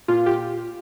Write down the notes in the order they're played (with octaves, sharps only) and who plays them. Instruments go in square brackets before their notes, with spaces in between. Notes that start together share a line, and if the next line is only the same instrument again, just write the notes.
[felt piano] A#2 [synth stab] F4
[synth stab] G4